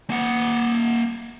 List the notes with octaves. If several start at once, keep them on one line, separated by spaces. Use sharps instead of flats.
A#3 F#5